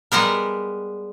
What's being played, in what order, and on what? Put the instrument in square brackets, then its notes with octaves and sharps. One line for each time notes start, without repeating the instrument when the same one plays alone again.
[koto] G3 G#3 B3 A#4